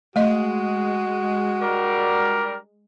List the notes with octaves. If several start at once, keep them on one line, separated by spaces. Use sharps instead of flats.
G#3 A3 F#4 D#5
G3 D4 A#4